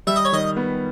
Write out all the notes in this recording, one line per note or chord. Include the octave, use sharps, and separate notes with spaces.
G3 E5
D#5
C#5
D#3 D#5
B3